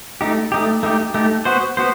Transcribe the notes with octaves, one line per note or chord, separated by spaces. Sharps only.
A3 D#4 G4
A3 D#4 G4
A3 D#4 G4
A3 D#4 G4
B3 F#4 C5
B3 F#4 C5